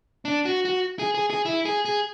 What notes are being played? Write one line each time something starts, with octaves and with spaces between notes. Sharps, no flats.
D4
F#4
F#4
G#4
G#4
G#4
E4
G#4
G#4